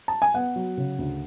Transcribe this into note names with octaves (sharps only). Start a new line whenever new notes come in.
A5
G#5
B3 F#5
F#3
C#3
D2